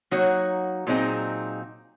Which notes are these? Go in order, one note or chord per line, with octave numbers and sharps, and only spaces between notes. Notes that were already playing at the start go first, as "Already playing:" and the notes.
F#3 A#3 D#4 F#4 C#5
A#2 F#3 C4 D#4 G#4